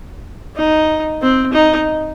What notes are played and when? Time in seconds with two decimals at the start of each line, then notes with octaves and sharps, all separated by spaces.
0.56 D#4
1.22 C4
1.53 D#4